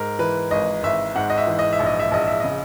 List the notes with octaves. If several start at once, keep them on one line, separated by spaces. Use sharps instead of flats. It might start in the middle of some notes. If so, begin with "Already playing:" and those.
Already playing: G#2 A#4
E3 B4
G#1 D#5
G#1 E5
G#2 F#5
D#5
E5
E3
D#5
E5
A#1
D#5
E5
A#1 D#5
E5
C#3 D#5